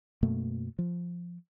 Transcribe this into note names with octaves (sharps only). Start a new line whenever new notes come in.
F#2 B2 A3 A#3
F3